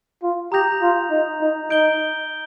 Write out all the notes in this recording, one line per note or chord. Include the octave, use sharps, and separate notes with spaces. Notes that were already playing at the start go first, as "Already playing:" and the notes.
F4
G4 A#5 D#6 G6 A#6 F7
F4
D#4
D#4
D#4 G6 D7 G7